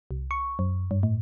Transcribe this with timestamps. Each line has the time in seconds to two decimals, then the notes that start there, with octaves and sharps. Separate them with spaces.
0.11 C2
0.31 C#6
0.59 F#2
0.91 G2
1.03 A2